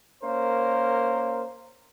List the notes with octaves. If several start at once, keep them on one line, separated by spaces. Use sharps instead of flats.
A#3 C#4 A#4 C5